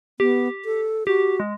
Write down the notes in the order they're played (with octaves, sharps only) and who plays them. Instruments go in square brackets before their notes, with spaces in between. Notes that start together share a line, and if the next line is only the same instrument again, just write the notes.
[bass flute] B3 [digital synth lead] G4
[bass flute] A4
[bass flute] F#4 [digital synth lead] G4
[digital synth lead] G#3